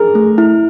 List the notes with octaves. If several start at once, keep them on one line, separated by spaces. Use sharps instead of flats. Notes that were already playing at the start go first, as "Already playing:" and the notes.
Already playing: G#4 A#4
A3
E4